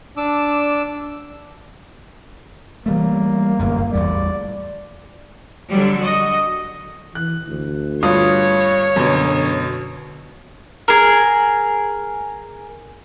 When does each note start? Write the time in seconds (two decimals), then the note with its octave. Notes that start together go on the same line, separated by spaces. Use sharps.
0.17 D4 D6 E6
2.86 E3 G3 A3 A#3
3.59 D1 G1 F#2
3.93 A1 E2 G3 D5
5.70 D3 F#3 G3
5.99 F#4 D#5
7.15 E3 F#6
7.48 D2
8.03 G2 F4 C#5 D#6
8.96 F#2 B2 D3
10.88 G#4 A#4